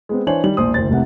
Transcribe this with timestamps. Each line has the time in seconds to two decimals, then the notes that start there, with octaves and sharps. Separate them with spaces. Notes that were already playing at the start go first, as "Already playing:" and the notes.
0.09 G#3 B3 C4
0.27 E3 D4 C5 C#5 G#5 F#7
0.44 D#3 G3 F#7
0.57 E1 A#1 C5 D#6
0.74 F#1 D2 C5 A6
0.90 F1 C2 C3 F#5